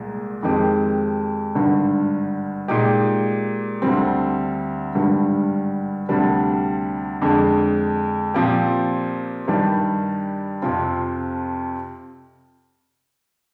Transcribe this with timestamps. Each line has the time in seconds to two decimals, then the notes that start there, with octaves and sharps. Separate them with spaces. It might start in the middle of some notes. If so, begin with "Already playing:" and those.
Already playing: C2 A#2 G#3
0.43 F2 D#3 G#3 C4 G4
1.55 G#1 G2 D3
2.68 A#2 G#3 D#4 G4
3.82 D2 D3 G3 C4
4.95 G#1 G2 D3 G3
6.09 D2 C3 G3 D4
7.22 F2 D3 G#3
8.34 A#2 F3 C4 G4
9.48 G2 D#3 G3 D4 G4
10.62 F2 C3 F3 C4 F4